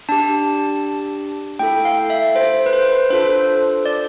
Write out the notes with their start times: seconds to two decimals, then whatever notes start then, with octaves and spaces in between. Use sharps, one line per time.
0.09 D4 G4 A5
1.59 A3 E4 A4 G5
1.85 F5
2.10 E5
2.35 C5
2.66 B4
2.73 C5
2.92 B4
3.10 D4 F4 A4 C5
3.86 D5